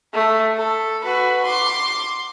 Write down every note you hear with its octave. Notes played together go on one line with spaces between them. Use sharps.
A3
A4
F#4 B4
C6 D6